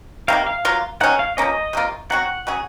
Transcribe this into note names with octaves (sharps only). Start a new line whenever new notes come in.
C3 D#3 A#3 F5
F5
F#3 A#3 F4
D#3 F#3 C#4 G#4 F#5
F5
F3 A#3 C#4 D#5
C3 F#3 A#3 F4
F#3 C4 F#4 F#5
F#3 C#4 G#4